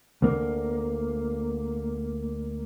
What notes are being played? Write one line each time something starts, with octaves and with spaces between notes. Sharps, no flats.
D2 A#3